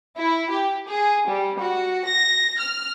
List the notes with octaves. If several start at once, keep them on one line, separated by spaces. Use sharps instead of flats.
E4
G4
G#4
G3
F#4
A#6
F6